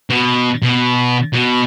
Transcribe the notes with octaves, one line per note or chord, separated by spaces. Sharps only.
B2
B2
B2